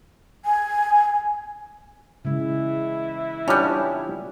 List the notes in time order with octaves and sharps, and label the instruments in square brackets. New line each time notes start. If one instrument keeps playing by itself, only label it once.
[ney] G#5
[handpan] C#3 G#3 [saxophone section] E3 E4
[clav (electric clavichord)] G3 D4 [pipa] B3 C#4 [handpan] F4